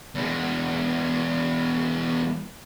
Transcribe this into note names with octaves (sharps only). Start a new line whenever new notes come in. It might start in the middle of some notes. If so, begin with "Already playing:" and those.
E2 G#3